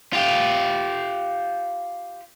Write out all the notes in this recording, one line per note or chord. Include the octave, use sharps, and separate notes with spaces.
F4 G4